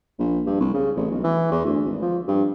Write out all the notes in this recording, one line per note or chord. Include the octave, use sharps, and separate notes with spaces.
A#1
G2
C2
C#3
A1
B1
E3
E2
D2
G#1
F3
G2